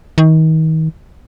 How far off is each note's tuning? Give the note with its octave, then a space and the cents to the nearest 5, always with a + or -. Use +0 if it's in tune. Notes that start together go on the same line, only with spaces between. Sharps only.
D#3 +35